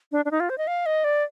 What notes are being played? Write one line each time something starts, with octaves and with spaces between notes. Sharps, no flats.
D4
D4
D#4
F4
C5
D#5
F5
D#5
D5